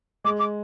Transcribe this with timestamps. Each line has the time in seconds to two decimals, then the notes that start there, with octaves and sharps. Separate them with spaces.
0.25 G#3 D6
0.39 D6